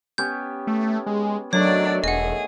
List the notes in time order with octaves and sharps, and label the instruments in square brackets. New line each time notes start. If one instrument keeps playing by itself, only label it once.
[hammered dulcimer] B3 C#4 G4 [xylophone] G6
[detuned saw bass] A3
G#3
[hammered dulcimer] D#3 A3 [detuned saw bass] F#3 [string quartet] D4 D5 [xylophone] C#5
[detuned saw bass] E1 [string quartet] G#4 [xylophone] D#5 F#5